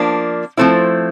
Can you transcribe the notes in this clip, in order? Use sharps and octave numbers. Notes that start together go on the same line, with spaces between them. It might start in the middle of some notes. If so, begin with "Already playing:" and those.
Already playing: F3 A#3 D4
F3 A3 C4 E4